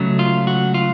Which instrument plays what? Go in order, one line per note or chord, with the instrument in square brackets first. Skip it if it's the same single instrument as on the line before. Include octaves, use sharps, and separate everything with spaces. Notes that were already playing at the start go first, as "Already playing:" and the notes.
Already playing: [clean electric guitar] C#2 C#3 F#3 A3
F4
F#4
F4